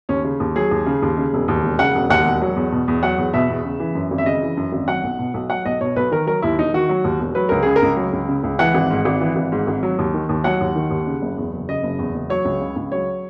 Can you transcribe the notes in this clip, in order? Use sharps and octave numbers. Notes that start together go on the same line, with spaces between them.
D#2 C#4
C#3
D#2
F#3 G#4
D#2
C#3
D#2
C#3
E1
D#2
E1
C#3 F#5
E1
D#2 F#5
E1
F#3
E2
B2
E2
F#3 F#5
E2
B2 E5
E2
C#3
E3
F#2
G#1
E5
C#3 D#5
E3
F#2
G#1
F#3 F#5
B1
B2
B1
F#3 F#5
B1 D#5
B2 C#5
B1 B4
D#3 A#4
F#3 A#4
D#2 E4
E1 D#4
D#3 F#4
F#3
D#2
E1
F#3 B4
C#2 A#4
C#3 G#4
A#4
C#2
F#3
C#2
C#3
C#2
E3 F#5
G#1
G#2
G#1
E3
G#1
G#2
G#1
F#3
D#2
D#3
D#2
F#3 F#5
D#2
D#3
D#2
C#3
F#1
E2
F#1
C#3 D#5
F#1
E2
F#1
F#3 C#5
C#2
C#3
C#2
F#3 C#5